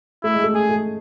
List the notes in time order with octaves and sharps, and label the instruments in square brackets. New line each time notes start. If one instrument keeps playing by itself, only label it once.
[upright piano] A3 [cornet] E4
[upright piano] G#3
A3
[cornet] G#4
[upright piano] A3